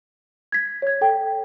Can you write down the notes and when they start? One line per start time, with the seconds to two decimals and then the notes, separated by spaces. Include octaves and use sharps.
0.52 G#6 B6
0.82 C#5 G#6
1.01 A4 G5